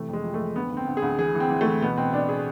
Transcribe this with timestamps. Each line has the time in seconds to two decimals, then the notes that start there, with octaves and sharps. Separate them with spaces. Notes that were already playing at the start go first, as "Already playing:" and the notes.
Already playing: C3 E3 A3
0.08 F2
0.13 G#3
0.23 F3
0.34 A3
0.39 F2
0.56 D2 B3
0.71 D2
0.77 C4
0.87 D2
0.97 G#4
1.02 D2
1.19 E3 G#4
1.35 E3
1.40 C4
1.50 E3
1.61 A3
1.66 E3
1.82 B2 B3
1.97 B2 C4
2.13 B2 D4
2.29 G#4